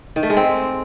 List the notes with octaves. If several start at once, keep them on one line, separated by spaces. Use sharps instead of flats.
D#3
A3
G#3
C4